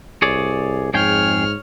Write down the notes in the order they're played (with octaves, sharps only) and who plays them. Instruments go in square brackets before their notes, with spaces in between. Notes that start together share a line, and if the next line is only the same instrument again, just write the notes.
[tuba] C2 [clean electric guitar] G#4 C#5 D5
[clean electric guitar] F2 G#4 G5 [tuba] G#2 [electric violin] C#5 F6